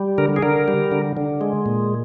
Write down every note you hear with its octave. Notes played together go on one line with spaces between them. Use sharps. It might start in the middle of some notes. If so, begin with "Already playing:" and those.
Already playing: G3
D3 A#4
G#4
D3 A#4
G3
D3
D3
G#3
A#2